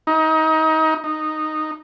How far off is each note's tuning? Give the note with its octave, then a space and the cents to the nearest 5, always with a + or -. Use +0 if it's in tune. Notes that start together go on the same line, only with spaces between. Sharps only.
D#4 +25
D#4 -10